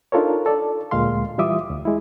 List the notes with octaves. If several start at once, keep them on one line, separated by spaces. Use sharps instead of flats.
D4 D#4 F4 A4 A#4 C#5
A4 D5
D2 A#2 G#3 F5 C6
E3 G3 F4 E5 D6 D#6
D2
G#3 E4